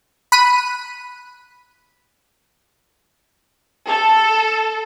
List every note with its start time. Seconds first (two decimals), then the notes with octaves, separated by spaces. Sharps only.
0.32 B5 F#6 D#7
3.88 A4